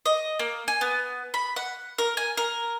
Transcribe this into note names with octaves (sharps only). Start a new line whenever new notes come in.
D#5
A#3
G#5
B3
B5
F#5
A#4
G#5
A#4